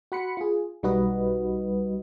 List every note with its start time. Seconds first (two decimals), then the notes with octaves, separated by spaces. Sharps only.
0.12 F#4 F#5 B5 C6 C#7
0.37 F4 G#4
0.83 B1 G3 D#4 F#4 B4 D#5